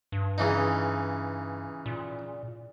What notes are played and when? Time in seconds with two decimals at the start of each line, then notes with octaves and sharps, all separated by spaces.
0.12 G2
0.38 C#3 E3 D#4
1.86 A#2